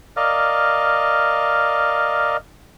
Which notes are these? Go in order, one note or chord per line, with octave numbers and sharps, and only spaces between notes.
A#4 D5 D#5 F5